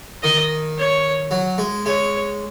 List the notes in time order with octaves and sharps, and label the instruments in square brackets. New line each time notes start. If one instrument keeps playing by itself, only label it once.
[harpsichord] D#3 [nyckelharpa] D#5
[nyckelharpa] C#5
[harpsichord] F#3
G#3
[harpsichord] G#3 [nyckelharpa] C#5